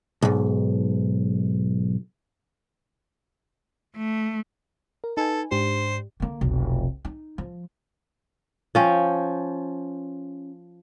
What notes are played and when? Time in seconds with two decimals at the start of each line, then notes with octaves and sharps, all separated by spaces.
0.22 B1 G#2
3.97 A3
5.04 A#4
5.17 D#4 A4 B4 G#5
5.51 G#2 D4 G4 C5
6.20 D3 A#3
6.41 F1 B1
7.05 D#4
7.38 F3
8.75 F3 C#4 G5